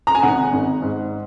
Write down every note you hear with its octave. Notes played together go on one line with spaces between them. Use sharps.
A#5
G#5
G#1 F#5
G#1
G#2